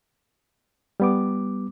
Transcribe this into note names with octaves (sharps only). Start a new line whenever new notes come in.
G3 B3 D6